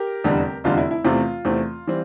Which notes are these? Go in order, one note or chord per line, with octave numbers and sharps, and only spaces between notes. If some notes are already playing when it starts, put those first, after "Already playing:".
Already playing: G4 A#4
F1 E2 D3 G3
F1 E2 D3 G3 F4
E4
E4
E2 C3 E3 A3 C4 F4
E2 C3 E3 A3 C4
E3 G3 C4